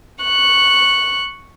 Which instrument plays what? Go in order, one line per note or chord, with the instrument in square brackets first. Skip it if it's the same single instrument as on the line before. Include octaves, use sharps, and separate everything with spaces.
[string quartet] C#6 F#6